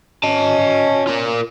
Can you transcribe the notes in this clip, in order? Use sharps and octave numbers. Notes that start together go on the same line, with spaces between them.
C#4 D#5 A5
F4 A#4